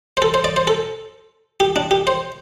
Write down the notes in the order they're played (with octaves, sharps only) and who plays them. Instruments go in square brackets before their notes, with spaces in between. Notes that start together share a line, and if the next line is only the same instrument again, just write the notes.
[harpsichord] C5
A4
C5
D5
C5
A4
G4
D4
G4
C5